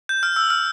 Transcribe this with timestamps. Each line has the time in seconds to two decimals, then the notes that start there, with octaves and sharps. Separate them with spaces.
0.09 G6
0.23 F6
0.36 E6
0.50 F6